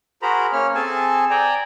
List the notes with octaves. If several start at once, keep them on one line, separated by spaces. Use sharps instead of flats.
F#4 G#4 A#4 C5 A#5 B5
A#3 C#4 C#5 F6
C4 G#4 A4 G#5 A5
D5 G5 G#5 A#5